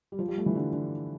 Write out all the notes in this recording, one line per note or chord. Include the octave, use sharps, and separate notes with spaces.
G3
F3
G3
A3
E3
D3
D3